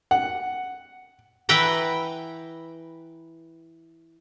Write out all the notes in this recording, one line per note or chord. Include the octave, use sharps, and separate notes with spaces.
F#5
E3 B4 F#5 G5 A#5